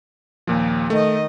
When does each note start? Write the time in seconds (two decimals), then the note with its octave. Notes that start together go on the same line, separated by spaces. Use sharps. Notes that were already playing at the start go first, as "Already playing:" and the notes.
0.47 D#2 A#2 F3
0.90 D#3 A3 D#5